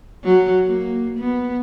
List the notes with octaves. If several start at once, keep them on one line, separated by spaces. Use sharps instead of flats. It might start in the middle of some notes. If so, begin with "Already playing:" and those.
F#3
A#3
B3